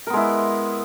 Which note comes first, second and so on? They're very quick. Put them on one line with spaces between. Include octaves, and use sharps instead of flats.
A#4 B3 G#3 E4